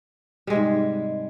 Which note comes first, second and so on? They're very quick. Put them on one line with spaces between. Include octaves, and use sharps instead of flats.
G3 G#3 C3 G#2